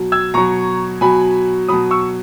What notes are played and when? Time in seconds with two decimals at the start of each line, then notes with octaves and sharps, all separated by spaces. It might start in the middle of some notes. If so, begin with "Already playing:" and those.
Already playing: B2 F#3
0.12 E6 G#6
0.34 B2 F#3 A#5 C#6
1.01 B2 F#3 G#5 B5
1.68 B2 F#3 B5 D#6
1.91 C#6 E6